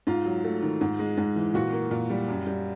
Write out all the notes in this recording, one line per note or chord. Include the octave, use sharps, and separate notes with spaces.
G#2 F4
F#3
A3
D#3
G#2
G#3
G#2
E3
A#2 F#4
A#3
A#2
G3
F#2
G3